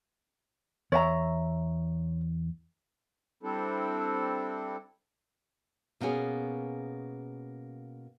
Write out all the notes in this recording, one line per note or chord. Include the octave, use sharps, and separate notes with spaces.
E2 C#5 E5 A#5
G3 C4 D4 E4 A4
B2 A#3 B3 C#4 G#4